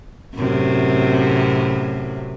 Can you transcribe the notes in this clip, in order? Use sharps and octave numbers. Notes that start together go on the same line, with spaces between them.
F#2 A2 C3